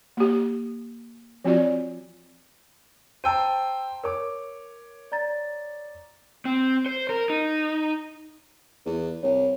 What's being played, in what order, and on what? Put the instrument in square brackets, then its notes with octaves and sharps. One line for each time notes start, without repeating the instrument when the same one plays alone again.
[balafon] A#3 G4
F3 C4 F4 F#4 D5
[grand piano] C5 G5 A5 [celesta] A#5 E6 D#7
[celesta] A#4 [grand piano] C#5 D6
[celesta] D5 A#5 A6
[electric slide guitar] C4
C5
A#4
D#4
[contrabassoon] E2
[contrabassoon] C2 [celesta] C#5